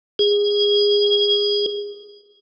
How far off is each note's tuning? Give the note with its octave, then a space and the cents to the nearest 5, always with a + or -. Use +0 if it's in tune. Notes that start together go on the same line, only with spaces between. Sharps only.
G#4 -20